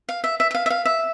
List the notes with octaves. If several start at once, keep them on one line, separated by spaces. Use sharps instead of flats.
F5
E5
E5
E5
F5
E5
F5
E5